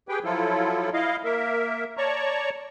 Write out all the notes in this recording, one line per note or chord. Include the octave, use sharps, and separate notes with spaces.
G4 G#4 B4 G5
F3 F#3 E4 F4 A4
E4 D#5 F5
A#3 A#4 E5
C#5 D5 A5 A#5 C#6